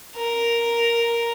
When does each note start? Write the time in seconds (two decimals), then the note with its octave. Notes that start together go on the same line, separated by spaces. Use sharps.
0.16 A#4